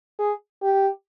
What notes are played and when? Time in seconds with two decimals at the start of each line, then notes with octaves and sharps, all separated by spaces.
0.19 G#4
0.62 G4